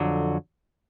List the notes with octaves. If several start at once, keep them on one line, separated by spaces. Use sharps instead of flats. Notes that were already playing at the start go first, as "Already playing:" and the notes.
Already playing: F2 D3 F#3